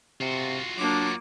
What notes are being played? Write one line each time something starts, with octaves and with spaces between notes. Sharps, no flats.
C3 F4 F#4
F#3 A#3 D4 D6